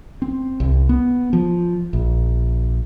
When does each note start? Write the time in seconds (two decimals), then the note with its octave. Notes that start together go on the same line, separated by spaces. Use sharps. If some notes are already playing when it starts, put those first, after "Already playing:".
0.22 C4
0.60 C2
0.89 B3
1.33 F3
1.93 A#1